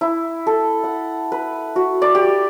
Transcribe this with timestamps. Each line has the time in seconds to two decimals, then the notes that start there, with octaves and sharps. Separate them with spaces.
0.01 E4
0.47 A4
0.84 F#5
1.32 B4
1.76 F#4
2.02 D5
2.15 G4